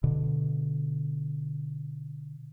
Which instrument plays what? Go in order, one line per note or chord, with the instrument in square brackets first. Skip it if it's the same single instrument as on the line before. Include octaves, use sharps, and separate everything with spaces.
[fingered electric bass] B2 D3